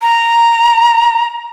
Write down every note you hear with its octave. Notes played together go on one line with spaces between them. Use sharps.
A#5